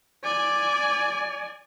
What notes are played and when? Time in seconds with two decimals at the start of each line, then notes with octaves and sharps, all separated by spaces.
0.24 D5 G#5 D6